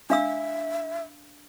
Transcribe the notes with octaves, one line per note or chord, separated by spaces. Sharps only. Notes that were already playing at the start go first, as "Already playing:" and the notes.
D4 E5 F5 E6